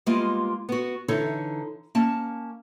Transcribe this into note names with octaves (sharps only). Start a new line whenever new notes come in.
G3 G#3 A#3 B3 F4 D#5
B3 F#4
D3 E3 D#4 A4 C#5
A#3 C#4 A5